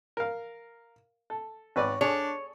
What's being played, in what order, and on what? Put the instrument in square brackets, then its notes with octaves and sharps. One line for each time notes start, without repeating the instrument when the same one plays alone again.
[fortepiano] A#4 F5
A4
[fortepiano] G#1 B4 D5 [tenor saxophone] C#5
[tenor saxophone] D4 [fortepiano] G#4 A4 [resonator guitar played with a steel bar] C#5